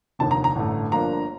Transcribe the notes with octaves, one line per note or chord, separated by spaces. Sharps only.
F1 D#2 D3 A5
A#5
A#5
A1 G2 D3 A3
G1 G2 F3 A#3 D4 A#5